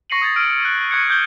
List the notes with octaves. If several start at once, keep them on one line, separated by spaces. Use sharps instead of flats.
C#6 A#6 C7 C#7 D#7 F#7
D#6 G#6 A6
E6 F6 D7
F#6
C#6 F#6 G#6 C#7
D6 G6 G7